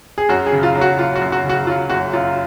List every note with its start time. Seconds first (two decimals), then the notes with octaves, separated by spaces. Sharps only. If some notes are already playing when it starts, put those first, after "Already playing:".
0.18 G#4
0.29 F#2 F#4
0.46 G#4
0.52 C#3
0.63 F4
0.75 F#3
0.81 F#4
0.97 F#1 F4
1.16 F#4
1.21 F#2
1.32 F#4
1.44 C#3
1.49 F#4
1.67 F#3 F4
1.90 F#1 F#4
2.13 F#2 F4